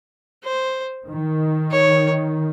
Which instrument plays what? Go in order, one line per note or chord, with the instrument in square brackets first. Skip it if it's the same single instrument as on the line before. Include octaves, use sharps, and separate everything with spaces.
[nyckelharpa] C5
[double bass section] D#3
[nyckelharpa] C#5